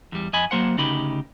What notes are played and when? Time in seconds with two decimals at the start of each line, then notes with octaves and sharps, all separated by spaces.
0.12 E2 G3
0.33 F2 D#5 G#5 B5
0.51 F#3 A#3 C5 F#5
0.78 D2 C#3 D#4 G4 B5